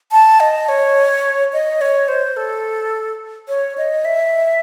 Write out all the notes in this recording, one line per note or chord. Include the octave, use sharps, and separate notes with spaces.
A5
D#5
C#5
D#5
C#5
C5
A4
C#5
D#5
E5